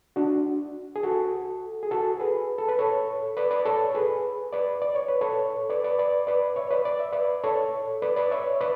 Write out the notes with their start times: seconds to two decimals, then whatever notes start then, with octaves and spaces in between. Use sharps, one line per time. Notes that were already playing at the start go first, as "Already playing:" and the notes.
0.16 D4 F#4
0.96 G#4
1.03 F#4 A4
1.83 G#4
1.91 F#4 A4
2.20 G#4 B4
2.58 A4
2.68 B4
2.79 A4 C#5
3.37 B4 D5
3.51 B4 D5
3.65 A4 C#5
3.95 G#4 B4
4.53 B4 D5
4.82 D5
4.95 C#5
5.08 B4
5.21 A4 C#5
5.69 B4 D5
5.84 B4 D5
5.99 B4 D5
6.27 B4 D5
6.56 C#5 E5
6.71 B4 D5
6.85 D5
6.99 E5
7.13 B4 D5
7.44 A4 C#5
8.02 B4 D5
8.16 B4 D5
8.31 C#5 E5
8.61 B4 D5